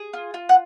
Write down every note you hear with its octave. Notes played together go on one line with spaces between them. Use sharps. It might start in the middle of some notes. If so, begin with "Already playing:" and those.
Already playing: G#4
F4
F4
F#5